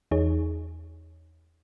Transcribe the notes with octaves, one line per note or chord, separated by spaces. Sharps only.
E2 D#4 G#4 C#5